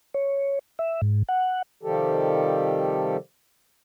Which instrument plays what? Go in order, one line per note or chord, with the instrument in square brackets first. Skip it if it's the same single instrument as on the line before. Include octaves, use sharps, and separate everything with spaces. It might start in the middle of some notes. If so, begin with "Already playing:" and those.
[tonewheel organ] C#5
E5
G#2
F#5
[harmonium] C3 D#3 F3 G3 G4 A4